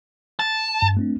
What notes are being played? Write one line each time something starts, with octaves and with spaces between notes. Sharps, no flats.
A5
G2
A3 C4 D4